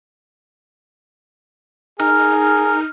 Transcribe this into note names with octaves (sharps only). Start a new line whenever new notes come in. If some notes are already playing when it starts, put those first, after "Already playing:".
D#4 G#4 A#4 F6